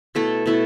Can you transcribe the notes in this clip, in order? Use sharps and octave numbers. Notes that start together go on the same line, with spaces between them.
B2 A3 E4 A4
B2 A3 E4 A4